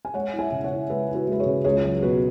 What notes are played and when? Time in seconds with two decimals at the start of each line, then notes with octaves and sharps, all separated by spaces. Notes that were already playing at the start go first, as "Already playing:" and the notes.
0.05 G#5
0.14 G#3 C#5 F#5
0.33 E4
0.39 E5 G#5
0.52 C#3
0.64 C#5 F#5
0.70 E4
0.90 G#3 B4 E5
1.08 E4
1.14 F#4 B4
1.27 G#3 B4
1.40 G#4 C#5
1.46 C#3
1.64 C#2 G#4 C#5
1.84 F#3
2.02 B2 F#4 B4